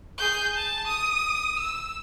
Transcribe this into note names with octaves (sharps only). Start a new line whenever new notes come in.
G#4 G6
A5
D#6
E6